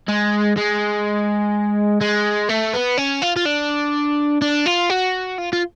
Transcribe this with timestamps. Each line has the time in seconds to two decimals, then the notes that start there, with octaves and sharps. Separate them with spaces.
0.09 G#3
0.57 G#3
2.01 G#3
2.49 A3
2.74 B3
2.98 C#4
3.22 F4
3.37 F4
3.46 D4
4.42 D4
4.66 F4
4.90 F#4
5.38 F4
5.53 F4